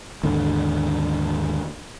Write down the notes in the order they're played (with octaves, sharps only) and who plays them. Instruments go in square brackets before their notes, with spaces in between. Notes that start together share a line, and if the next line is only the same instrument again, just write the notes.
[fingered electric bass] D#2 G#2 D3